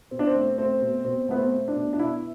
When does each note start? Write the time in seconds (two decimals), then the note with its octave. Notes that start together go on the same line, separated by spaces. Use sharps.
0.11 B2 C4
0.19 D4
0.27 C4
0.35 A3
0.58 A3 C4
0.81 B2
1.05 B2 C4
1.29 A3 B3
1.37 C4
1.53 A3
1.68 D4
1.75 B2
1.93 D4
1.99 B2 E4